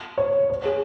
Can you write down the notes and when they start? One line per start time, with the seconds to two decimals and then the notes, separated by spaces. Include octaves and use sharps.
0.18 C#5
0.50 C#5
0.65 G#4